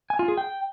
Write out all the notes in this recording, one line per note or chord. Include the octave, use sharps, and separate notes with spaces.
G#5
F4
G#4
G5